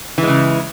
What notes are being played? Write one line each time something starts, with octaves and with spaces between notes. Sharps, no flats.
C#3 E3 G#3